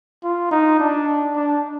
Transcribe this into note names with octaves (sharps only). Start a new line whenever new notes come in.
F4
D#4
D4
D4